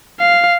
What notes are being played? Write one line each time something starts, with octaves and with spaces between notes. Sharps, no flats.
F5